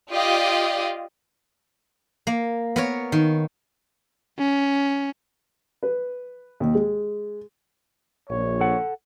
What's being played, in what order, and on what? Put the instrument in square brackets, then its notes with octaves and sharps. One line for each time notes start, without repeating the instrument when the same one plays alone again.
[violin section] F4 G4 D5 D#5
[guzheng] A#3
B3 A#4 C#5
D#3
[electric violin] C#4
[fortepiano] B4
D#2
G#3
[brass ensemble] A#1 [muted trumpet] C#5
[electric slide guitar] A4 F#5